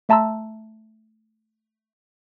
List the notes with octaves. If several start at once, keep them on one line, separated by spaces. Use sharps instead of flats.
A3 E5 A5 A#5 C6 E6